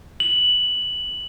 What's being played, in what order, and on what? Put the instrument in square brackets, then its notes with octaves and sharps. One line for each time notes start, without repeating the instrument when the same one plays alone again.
[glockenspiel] F#7